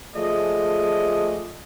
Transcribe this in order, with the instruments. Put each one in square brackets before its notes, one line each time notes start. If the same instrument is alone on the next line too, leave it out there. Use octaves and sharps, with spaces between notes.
[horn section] F3 A3 G#4 D5 D#5